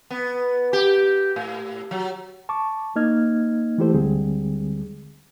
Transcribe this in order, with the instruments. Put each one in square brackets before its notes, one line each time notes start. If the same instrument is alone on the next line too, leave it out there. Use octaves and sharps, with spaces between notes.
[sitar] B3
G4
A2
F#3
[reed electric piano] A5 C#6 D6
A#3 D#4 D#5 F6 G#6
E3 A3 E4 G4 A4 C5
D2 D3 G3 G#3 C4 G#4